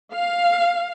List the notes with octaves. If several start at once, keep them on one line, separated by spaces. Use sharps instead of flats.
F5